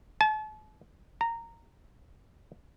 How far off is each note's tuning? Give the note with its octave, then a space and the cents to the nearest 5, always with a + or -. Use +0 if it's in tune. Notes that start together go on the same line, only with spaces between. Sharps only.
A5 -40
A#5 -15